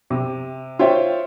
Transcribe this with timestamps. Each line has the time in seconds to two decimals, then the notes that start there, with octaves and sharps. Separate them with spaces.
0.10 C3
0.79 F4 C5 C#5 E5 G5